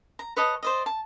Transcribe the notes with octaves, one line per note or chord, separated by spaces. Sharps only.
A#5
B4 C#5 D#5 A5
C5 D5 D#5
A5